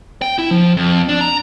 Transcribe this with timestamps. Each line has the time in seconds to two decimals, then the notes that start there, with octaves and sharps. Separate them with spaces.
0.22 G5
0.38 E4
0.51 F3
0.77 F2
1.09 D4
1.21 A#5